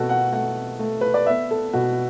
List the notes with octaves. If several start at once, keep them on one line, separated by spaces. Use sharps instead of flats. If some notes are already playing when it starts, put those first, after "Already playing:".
Already playing: B2 A3 F#4 A4
F#5
A3 F#5
A3
B4
D5
B3 E5
A4
B2 F#4